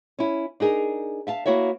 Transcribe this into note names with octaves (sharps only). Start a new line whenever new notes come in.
C#4 E4
D4 D#4 G#4 A#4
E5 F5 A5
A#3 E4 F#4 C#5 E5